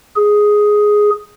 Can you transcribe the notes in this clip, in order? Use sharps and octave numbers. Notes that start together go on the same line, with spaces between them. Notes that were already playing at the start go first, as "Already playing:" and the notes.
G#4